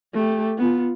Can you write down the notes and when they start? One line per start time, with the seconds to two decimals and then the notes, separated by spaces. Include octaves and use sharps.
0.14 A3 G4
0.58 B3 F4